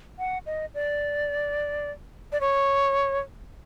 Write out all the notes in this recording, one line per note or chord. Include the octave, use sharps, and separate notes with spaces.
F#5
D#5
D5
D5
C#5